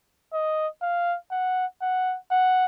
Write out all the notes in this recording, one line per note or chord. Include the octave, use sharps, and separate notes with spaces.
D#5
F5
F#5
F#5
F#5